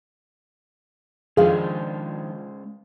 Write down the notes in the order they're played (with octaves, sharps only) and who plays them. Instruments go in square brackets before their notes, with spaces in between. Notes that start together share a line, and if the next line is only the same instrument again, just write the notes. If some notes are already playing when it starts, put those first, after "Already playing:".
[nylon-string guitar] D#3 F3 D4 [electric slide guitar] G#3 C#4 C5 [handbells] G#4 F5